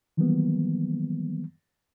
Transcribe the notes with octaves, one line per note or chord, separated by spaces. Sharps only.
D#3 E3 F#3 G3 A#3 B3